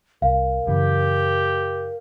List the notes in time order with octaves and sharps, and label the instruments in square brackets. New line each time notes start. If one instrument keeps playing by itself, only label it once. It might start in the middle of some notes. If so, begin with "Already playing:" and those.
[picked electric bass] C2 [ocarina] A#4 [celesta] F5
[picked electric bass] F#2 C#3 E3 [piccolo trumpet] G4